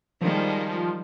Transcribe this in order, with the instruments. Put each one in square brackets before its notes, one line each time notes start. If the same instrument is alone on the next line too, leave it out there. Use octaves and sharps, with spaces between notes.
[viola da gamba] D#3 G3 G#3 [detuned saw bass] F3